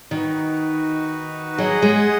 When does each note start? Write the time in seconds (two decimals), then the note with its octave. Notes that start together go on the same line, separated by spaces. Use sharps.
0.11 D#3 D#4 F#4 B4
1.58 F#3 G#4 D#5 F#5
1.82 G#3